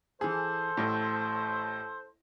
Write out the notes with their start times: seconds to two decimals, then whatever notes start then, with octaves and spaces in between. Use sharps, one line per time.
0.21 E3 G#4 A4 C5
0.77 A1 A2